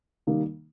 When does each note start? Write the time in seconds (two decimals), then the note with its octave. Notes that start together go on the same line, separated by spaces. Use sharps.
0.27 D#3 G3 A#3 D#4